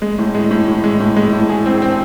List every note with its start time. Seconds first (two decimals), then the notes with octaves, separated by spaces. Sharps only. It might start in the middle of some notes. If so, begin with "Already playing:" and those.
0.02 G#3
0.19 A2
0.35 G#3
0.51 A2
0.68 A2
0.84 G#3
1.00 A2
1.17 G#3
1.33 A2
1.49 G#4
1.66 C4
1.82 C4